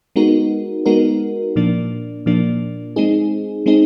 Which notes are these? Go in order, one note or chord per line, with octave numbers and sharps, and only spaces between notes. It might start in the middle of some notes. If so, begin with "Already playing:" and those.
G#3 B3 D#4 F#4 A#4
G#3 B3 D#4 F#4 A#4
A#2 F3 A#3 D4
A#2 F3 A#3 D4
G#3 C4 D#4 G#4
G#3 C4 D#4 G#4